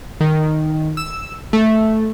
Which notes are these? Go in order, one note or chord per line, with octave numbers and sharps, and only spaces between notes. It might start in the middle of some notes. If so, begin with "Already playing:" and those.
D#3
E6
A3